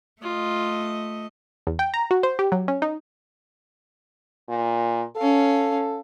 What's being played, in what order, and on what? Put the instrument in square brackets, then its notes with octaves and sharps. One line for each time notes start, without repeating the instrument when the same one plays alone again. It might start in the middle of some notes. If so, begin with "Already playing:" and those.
[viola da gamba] A3 D#5 [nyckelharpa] F4
[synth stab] E2
G5
A#5
F#4
C5
G4
F#3
C#4
D#4
[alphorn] A#2
[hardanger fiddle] C#4 F5 [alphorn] A4